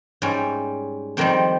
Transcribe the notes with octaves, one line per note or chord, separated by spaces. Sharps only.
G#2 G3 C#4
F2 D#3 G3 C4